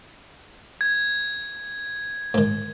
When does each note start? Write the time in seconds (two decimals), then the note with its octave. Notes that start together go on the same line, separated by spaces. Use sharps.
0.81 G#6
2.34 G#2 D#3